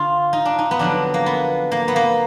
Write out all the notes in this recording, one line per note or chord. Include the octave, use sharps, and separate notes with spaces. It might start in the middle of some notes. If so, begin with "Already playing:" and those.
Already playing: D3 F4
D#4
D4
D#4
B3
F2 D3 F#3 D4
A#3
B3
A#3
B3
A#3